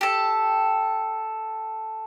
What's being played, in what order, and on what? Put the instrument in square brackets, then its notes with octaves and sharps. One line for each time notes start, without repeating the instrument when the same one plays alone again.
[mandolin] G4 A4